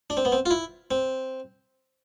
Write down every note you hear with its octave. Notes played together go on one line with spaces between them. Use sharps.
D4
C4
B3
C4
F4
E4
C4